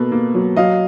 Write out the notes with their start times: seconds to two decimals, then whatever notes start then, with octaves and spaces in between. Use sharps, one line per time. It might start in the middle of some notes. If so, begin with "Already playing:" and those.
Already playing: B2 A#3 A4 B4
0.12 A#3
0.34 F#3
0.56 F#3 D#5 F5